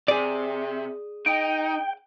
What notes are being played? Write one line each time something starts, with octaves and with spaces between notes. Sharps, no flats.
C3 G#4 D5
D#4 G5